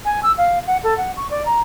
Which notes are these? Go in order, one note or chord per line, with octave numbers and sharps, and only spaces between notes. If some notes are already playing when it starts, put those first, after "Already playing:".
G#5
E6
F5
F#5
A4
F#5
C#6
D5
A#5